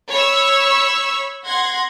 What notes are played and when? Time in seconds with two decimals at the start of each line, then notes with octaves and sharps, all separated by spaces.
0.13 C#5 B5 C#6 E6
1.46 F#5 C6 G#6 A#6